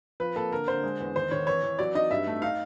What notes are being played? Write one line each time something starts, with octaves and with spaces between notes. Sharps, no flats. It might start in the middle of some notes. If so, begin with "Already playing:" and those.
F3 B4
A#3 A4
D3 A#4
D3 C5
G#3
E2
D#3 C5
D#3 C#5
E3 C#5
E3
F#3 D5
D#4 D#5
G2 E5
A3
D#4 F5